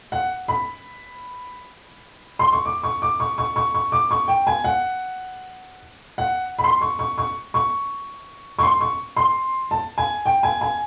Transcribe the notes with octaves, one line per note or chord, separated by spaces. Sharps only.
F#5
B5
C6
C#6
D6
C#6
D6
C#6
C#6
C#6
C#6
D6
C#6
G5
G#5
F#5
F#5
B5
C6
C#6
C#6
C#6
C#6
C#6
C6
C#6
C6
A5
G#5
G5
G#5
G#5